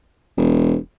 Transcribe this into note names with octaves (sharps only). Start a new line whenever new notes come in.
E1